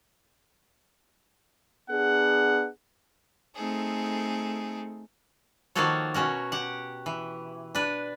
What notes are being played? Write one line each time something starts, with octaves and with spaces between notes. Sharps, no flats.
B3 D4 G#4 F#5
A3 C4 D#4 G#4 A4
D#3 F3 A#3 F#4 A4 C#5
B2 C#4 F#4 A#4
G4 F#5
E3
D4 B4